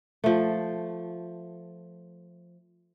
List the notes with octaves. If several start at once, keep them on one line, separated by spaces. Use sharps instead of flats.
F3 A3